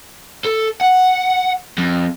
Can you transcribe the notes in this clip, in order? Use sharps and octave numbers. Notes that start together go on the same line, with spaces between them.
A4
F#5
F2